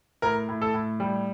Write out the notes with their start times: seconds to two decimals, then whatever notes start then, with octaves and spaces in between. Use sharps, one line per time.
0.22 A2 A#4
0.49 A2
0.61 A4
0.74 A2
1.00 G3